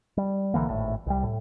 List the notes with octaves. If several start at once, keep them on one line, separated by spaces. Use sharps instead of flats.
G3
B1 D3 E3 A#3
G#1 A2
C2 G3
A2